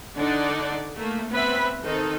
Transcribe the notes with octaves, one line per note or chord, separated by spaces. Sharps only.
D3 D4 D#4 A4 D5 F#5
A3 A#3
B3 C4 B4 E5 B5
D#3 C4 D#4 A4